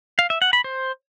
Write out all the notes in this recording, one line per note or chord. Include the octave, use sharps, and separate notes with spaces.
F5
E5
F#5
B5
C5